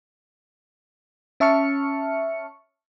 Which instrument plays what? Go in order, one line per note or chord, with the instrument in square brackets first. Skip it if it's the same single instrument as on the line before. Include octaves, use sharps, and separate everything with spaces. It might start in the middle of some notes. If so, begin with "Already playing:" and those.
[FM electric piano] C#4 E5 A5 C#6 F6 C#7